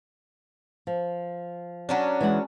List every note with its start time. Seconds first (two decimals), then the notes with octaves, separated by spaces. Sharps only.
0.87 F3
1.89 F#3 C#4 D4
2.21 E3 G#3 F#5